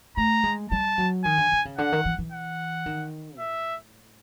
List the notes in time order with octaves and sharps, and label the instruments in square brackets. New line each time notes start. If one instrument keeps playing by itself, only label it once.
[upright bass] A3 [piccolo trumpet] A#5
[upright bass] G#3
[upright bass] G3 [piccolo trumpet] A5
[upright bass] F#3
[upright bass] D#3 [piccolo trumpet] G#5
[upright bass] D3
D3
C#3
[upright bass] D3 [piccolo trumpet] F#5
[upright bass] D#3
E3
E3
[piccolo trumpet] F#5
[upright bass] D#3
[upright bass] A2 [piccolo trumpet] E5